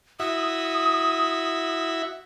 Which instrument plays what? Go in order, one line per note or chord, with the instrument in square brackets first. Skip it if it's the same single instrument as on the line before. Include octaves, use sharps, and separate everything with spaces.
[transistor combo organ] E4 F#4 E5 [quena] D#6